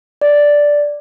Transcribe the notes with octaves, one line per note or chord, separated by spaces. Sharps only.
D5